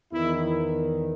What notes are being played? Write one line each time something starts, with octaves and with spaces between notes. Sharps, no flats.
E2 D#3 E4